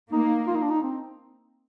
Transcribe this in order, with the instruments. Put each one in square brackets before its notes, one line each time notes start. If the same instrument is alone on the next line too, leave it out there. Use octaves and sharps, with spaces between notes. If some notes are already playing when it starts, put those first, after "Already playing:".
[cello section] A#3 [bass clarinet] D#4
[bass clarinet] F4
D#4
D4
D#4
C4